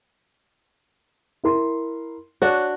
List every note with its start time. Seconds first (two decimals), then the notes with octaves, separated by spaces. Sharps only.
1.44 E4 A#4 C6
2.42 D4 F#4 C#5